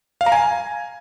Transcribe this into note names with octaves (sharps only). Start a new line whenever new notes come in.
F5
A#5
G#5